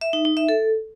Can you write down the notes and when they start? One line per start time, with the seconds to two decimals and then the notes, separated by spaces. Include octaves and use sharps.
0.01 E5
0.13 D#4
0.25 D#4
0.37 E5
0.49 A4